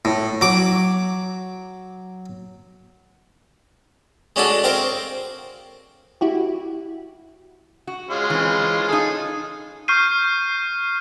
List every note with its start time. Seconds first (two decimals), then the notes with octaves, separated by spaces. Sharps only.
0.05 A2
0.41 F#3 D6
4.36 G#3 C#4 D4 F#4 A4
4.64 C4 A#4 C5 F5
6.21 E4 F#4 G4
7.87 F#4
8.10 G#3 C#4 F4
8.30 E3 C4
8.89 D#4 F4 G#4 A4
9.88 C#6 F6 G6 C7 D#7